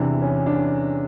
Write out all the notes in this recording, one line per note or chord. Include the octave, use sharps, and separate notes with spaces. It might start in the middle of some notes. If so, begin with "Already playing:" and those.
Already playing: E2 C3 E3 D4
C#4
D4